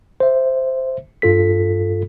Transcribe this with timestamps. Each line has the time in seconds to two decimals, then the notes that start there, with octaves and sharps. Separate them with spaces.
0.20 C5 E5
1.22 G2 F4 A4 B6